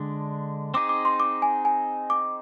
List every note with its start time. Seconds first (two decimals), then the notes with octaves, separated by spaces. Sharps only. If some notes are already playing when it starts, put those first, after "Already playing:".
Already playing: D3 G#3 D4
0.74 C4 D#4 G#4 D6
0.89 D6
1.05 C6
1.20 D6
1.42 G#5
1.65 G#5
2.10 D6